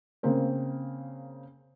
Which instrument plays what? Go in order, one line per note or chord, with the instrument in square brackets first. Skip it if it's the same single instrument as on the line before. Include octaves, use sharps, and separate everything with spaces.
[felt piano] C#3 A#3 C4 A#4